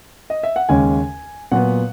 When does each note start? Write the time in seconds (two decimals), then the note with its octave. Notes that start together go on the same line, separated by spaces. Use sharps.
0.30 D#5
0.43 E5
0.56 F#5
0.69 D#2 C#3 G#3 C#4 G#5
1.52 A#2 F#3 B3 F#5